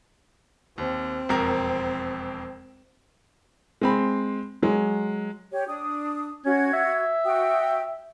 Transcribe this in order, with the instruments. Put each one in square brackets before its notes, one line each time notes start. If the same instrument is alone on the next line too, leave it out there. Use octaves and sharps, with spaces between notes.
[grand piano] D#2 [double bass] C4
[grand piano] E1 F2 A#4
[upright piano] G#3 C4 B5
F#3 G#3
[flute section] G4 C#5
D4 D#6
[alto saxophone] C#4 [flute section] F#4 G#6
[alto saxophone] E5
[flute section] F#4 G5 D#6